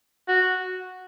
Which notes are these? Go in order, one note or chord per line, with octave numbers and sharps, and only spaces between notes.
F#4